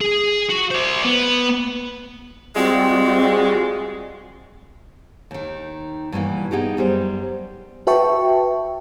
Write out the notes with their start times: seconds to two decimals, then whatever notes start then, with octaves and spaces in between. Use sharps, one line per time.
0.01 G#4
0.50 F#4
0.71 C5 D5
1.04 B3
2.56 G3 G#3 C4 F4 F#4
5.31 D#2 D#3
6.12 G2 B2 E3 A#3
6.51 B3 D#4 G4 G#4
6.77 F#2 G3 B3 C5
7.87 F#4 B4 E5 G5 A5 C#6